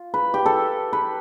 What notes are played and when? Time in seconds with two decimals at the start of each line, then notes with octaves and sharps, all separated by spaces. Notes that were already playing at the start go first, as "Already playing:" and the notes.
Already playing: F4
0.14 B4
0.34 G4
0.46 A4
0.93 B4